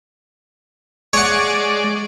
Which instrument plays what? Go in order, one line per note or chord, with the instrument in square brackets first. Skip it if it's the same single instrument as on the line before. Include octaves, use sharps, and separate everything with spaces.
[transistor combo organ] G#3 D5 [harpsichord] C#5 F#5